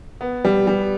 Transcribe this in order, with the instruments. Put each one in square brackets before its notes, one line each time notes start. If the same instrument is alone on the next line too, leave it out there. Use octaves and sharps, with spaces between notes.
[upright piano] B3
G3
G3